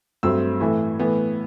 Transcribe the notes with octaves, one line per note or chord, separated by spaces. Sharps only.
G2 F#3 A3 C4 E6
A2 E3 A3
A2 E3 B3